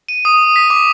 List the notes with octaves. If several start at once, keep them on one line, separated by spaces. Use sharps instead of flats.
D#7
D#6
B6
D6